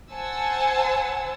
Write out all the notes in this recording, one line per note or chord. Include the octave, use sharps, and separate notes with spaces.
C5 F#5 G#5 A5 E6